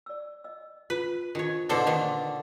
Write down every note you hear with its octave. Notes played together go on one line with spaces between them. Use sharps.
D5 E6
D#5 E6
F4 B4
D#3 D4 F4 C5 C#5
B2 D3 D4 D#4 A4 B4 C5 D6
A#2 D#3 G5